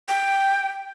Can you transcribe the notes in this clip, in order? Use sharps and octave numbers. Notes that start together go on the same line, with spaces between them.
G5